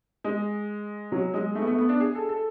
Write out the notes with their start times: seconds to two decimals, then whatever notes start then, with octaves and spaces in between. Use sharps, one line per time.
0.24 G#3
1.12 F#3
1.34 G#3
1.55 A3
1.62 B3
1.67 A3
1.78 B3
1.89 D4
2.00 G#4
2.15 A4
2.29 A4